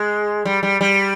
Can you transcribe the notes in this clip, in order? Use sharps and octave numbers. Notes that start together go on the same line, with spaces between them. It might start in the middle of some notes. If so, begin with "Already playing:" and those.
Already playing: G#3
G3
G3
G3